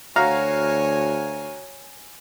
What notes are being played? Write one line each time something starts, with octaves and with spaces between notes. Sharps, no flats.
D2 F#4 C#5 F5 G#5 A#5